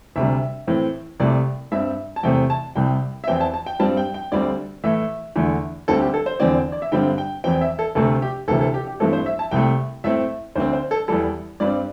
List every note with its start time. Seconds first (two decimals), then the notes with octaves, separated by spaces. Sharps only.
0.16 D2 C3 G3 E5
0.67 A2 E3 C4
1.20 C2 C3 A3 D5
1.72 G2 G3 C4 E5
2.16 A5
2.23 E2 C3 A3 C4 G5
2.50 A5
2.76 C2 C3 G3 G5
3.24 E5
3.27 E2 E3 C4 G5
3.41 A5
3.54 A5
3.66 G5
3.79 G2 G3 C4 A5
3.97 G5
4.14 G5
4.32 D2 D3 G3 C4 D5
4.84 A2 E3 A3 E5
5.36 E2 D3 A3
5.88 D2 D3 G3 C4 A4
6.01 G4
6.14 A4
6.26 C5
6.40 E2 D3 C4 D5
6.72 D5
6.82 E5
6.92 G2 D3 G3 C4 G5
7.18 G5
7.44 E2 E3 C4 G5
7.61 E5
7.79 A4
7.95 D2 C3 A3 C4 A4
8.22 G4
8.48 D2 C3 E3 C4 A4
8.61 A4
8.74 G4
8.87 G4
9.00 G2 E3 A3 C4 A4
9.13 C5
9.26 E5
9.39 A5
9.51 C2 C3 A3 G5
10.04 A2 A3 C4 E5
10.55 D2 D3 C4 C5
10.73 C5
10.91 A4
11.08 E2 E3 G3 A4
11.60 G2 G3 C4 D5